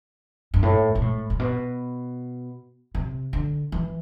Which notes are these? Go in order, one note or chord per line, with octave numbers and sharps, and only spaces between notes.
G2
A2
B2
A2
A2
B2
C3
D3
E3